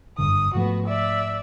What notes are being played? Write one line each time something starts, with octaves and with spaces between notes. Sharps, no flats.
F#1 G2 D3 D#6
G#2 F3 A3 B3 F#4
D5 E5